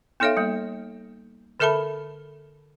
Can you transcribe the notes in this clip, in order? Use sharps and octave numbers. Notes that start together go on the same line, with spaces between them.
B3 D#4 A4 C#5 E5 F5
G3 A#3
D3 A4 A#4 E5 A5 B5